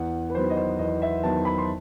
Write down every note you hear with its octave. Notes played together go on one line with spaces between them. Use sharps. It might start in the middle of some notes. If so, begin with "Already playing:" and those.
Already playing: E2 F#5
B4
D#3 F#3 B3 C5
D#5
C5
E2 D#5
E5
D#3 F#3 B3 A5
B5
C6